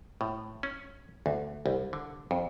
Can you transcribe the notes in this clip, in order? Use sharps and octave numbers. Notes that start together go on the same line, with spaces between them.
A2
C#4
D2
C2
D3
F2